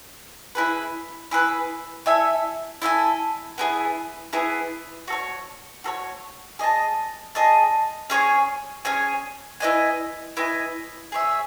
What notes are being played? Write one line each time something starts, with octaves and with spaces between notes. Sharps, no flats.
E4 G#4 B4
E4 G#4 B4
E4 A4 E5 G#5
E4 A4 E5 G#5
B3 E4 G#4
B3 E4 G#4
F#4 A4 C#5
F#4 A4 C#5
G#4 D#5 A5
G#4 D#5 A5
C#4 G#4 C#5 G#5
C#4 G#4 C#5 G#5
E4 B4 D#5 G#5
E4 B4 D#5 G#5
G#4 C#5 E5